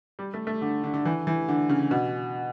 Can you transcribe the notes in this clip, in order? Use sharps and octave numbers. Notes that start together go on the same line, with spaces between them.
G3
A3
A3
D3
D3
D3
E3
E3
D3
C#3
B2